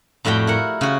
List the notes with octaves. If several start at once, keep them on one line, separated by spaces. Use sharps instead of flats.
F2 A2 G3 F#4 G5
E4 A#4 F#5
C#3 F#4